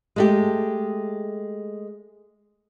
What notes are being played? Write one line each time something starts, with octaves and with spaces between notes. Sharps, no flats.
G#3 A3 G4